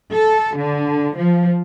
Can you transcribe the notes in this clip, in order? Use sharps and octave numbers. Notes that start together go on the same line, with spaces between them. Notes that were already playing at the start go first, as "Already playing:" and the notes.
A4
D3
F3